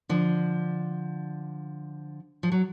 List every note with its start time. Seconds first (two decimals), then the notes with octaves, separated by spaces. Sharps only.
0.09 D3 F3
2.43 F3
2.52 F#3